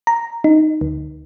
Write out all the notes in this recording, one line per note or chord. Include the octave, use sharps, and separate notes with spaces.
A#5
D#4
D2